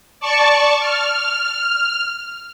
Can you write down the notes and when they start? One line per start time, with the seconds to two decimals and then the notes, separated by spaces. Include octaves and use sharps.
0.20 D5 A5 C#6
0.80 F6